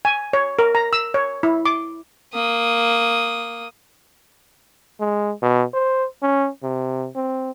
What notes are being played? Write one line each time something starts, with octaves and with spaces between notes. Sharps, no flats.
G#5
C#5
A#4
A#5
E6
C#5
E4
D6
A#3 D#6
G#3
B2
C5
C#4
C3
C4